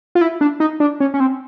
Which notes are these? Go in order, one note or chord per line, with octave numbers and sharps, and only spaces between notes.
F4
E4
D4
D#4
D4
C#4
C#4
C4